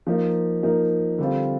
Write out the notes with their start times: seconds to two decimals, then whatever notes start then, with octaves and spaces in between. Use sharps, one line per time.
0.07 F3 A#3 D#4 A#4
0.63 F3 A#3 D#4 A#4
1.18 D3 G3 C4 F4